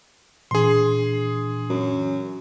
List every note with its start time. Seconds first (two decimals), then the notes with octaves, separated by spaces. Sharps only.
0.51 A#2 E3 D4 G#4 C6
1.70 F#2